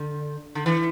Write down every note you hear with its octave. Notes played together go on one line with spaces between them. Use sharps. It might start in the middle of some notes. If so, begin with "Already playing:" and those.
Already playing: D3
D3
E3